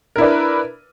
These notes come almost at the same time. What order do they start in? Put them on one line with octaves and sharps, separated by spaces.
A#4 E4 D4 B4